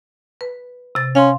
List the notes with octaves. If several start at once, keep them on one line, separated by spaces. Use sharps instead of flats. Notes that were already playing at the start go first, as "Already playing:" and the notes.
B4
C3 A6
C#4 F5 C6